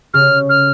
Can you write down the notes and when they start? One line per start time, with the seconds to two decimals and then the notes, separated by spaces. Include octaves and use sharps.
0.14 C#3 F6
0.49 F6